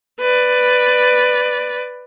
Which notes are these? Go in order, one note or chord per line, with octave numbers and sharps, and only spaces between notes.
B4 D5